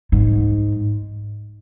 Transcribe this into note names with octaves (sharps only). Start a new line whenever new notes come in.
G#2